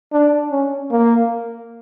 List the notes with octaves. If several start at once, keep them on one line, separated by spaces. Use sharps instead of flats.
D4
C#4
A#3